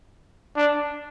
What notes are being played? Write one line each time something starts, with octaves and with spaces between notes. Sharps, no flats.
D4